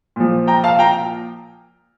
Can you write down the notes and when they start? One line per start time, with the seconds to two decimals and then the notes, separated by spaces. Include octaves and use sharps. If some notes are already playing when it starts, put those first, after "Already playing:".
0.16 A#2 F3
0.47 G5 A#5
0.64 F5 A5
0.79 G5 A#5